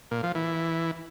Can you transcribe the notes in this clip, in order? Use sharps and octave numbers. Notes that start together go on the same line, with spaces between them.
A#2
F3
E3